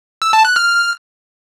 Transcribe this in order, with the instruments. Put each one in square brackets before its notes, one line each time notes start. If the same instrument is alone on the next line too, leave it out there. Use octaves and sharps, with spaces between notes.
[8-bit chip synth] E6
A5
F#6
F6